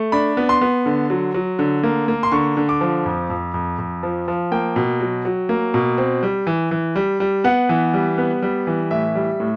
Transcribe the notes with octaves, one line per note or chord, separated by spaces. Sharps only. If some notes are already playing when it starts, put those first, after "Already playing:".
Already playing: A3
D4 B5
B3
C6
B3
D3
F#3
F#3
D3
A#3
A#3
C6
D3 C#6
D3
D6
F3
F2
F2
F2
F2
F3
F3
A#3 G5
B2
F#3
F#3
A#3
B2
C4
G3
E3
E3
G3
G3
B3 F#5
E3
G3
B3
G3
E3
A2 E5
G3
A2